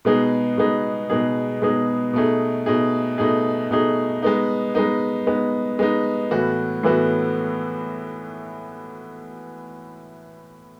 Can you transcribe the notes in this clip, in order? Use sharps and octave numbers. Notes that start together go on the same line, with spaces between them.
B2 G#3 B3 D#4 G#4
B2 G#3 B3 D#4 G#4
B2 G#3 B3 D#4 G#4
B2 G#3 B3 D#4 G#4
B2 A3 D#4 G#4
B2 A3 D#4 G#4
B2 A3 D#4 G#4
B2 A3 D#4 G#4
G#3 B3 D#4
G#3 B3 D#4
G#3 B3 D#4
G#3 B3 D#4
A2 E3 B3 F#4
A2 E3 B3 F#4